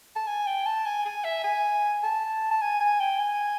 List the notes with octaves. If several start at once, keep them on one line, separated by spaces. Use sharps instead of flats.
A5
G#5
G5
A5
G#5
G#5
E5
G#5
A5
A5
G#5
G#5
G5
G#5